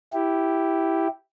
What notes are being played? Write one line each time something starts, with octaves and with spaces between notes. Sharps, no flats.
E4 G4